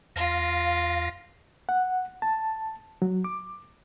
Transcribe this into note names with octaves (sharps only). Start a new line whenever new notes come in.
E2 F4 F5 A#6
F#5
A5
F#3
D6